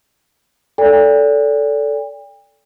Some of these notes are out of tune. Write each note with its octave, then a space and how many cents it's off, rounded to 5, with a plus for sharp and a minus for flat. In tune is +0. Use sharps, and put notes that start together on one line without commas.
A4 +0 D5 -30 G5 +45